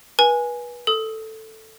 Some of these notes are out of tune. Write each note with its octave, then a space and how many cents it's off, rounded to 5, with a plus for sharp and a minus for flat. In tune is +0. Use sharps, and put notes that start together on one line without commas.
B4 -30 G#5 +0
A4 +5 D#6 +25